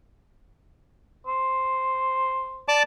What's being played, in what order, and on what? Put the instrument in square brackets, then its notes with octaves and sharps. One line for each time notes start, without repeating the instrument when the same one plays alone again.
[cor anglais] C5
[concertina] D5 A5 D6